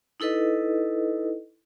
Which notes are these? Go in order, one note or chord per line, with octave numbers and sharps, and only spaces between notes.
D#4 E4 A4 B4 D#5